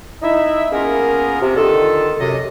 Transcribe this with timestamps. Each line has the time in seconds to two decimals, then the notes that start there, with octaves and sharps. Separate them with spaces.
0.22 D#4 E4 E5
0.72 A#3 B3 C#4 F4 G#4 A#4
1.42 C3
1.56 D3 D#3 F4 A4
2.20 F#2 C3 D#5